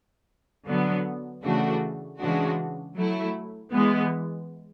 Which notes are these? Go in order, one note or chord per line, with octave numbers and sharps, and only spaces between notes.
D3 F#3 B3
C#3 E3 A3 D4 F#4
C#3 E3 G#3 D4 F#4
F#3 A3 E4
E3 G#3 B3